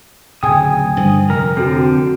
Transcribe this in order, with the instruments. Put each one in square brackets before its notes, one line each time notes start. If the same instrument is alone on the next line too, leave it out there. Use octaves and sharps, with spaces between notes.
[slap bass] D1 C#3 [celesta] G5 G#5 G#6 [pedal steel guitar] D#6
[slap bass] G2 D3 F3
[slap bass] F1 [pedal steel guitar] A#4
[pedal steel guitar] D3 C4 [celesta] F#4 A4